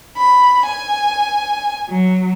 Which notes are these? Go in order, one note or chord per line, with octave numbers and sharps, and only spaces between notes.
B5
G#5
F#3